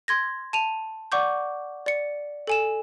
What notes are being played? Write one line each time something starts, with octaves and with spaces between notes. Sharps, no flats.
C6 G#6 A#6
A5 D#7 F7
D5 F#5 C#6 D6 G6
D5 C#7
A4 G#5 E7